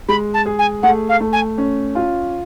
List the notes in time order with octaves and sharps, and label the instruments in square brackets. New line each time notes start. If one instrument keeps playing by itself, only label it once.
[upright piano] G#3 [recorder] B5
[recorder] A5
[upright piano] G#4
[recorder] G#5
[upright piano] A3 [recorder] F#5
[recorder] F5
[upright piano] A3
[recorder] G#5
[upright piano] C#4
F4